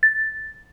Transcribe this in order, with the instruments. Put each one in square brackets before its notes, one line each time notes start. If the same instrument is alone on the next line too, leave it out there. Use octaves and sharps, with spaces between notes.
[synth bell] A6